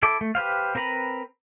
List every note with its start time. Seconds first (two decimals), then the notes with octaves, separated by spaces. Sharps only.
0.03 E4 A4 D6
0.21 A3
0.35 G4 B4 C5 F5
0.75 C4 A#4 B4 A#5 B5